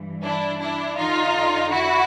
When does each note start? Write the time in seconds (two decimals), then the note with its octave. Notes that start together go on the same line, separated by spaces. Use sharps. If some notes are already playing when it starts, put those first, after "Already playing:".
Already playing: G2 E3
0.24 D4 E4
0.61 D4 E4
0.97 F2 D3 D#4 F4
1.71 E4 F#4